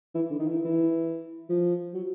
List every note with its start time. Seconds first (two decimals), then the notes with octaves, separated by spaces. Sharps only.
0.14 E3
0.30 D3
0.38 D#3
0.47 E3
0.64 E3
1.49 F3
1.94 F#3